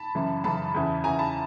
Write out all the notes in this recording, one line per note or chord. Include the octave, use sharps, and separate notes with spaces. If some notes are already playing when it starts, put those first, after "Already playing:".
Already playing: A5 B5
F#2 C#3 E3
F#2 C#3 E3 A5 B5
E2 C#3 E3
E2 C#3 E3 G#5 A#5
A5 B5